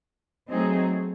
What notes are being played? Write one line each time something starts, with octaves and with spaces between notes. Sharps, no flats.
F#3 A3 C4 D#4 G#4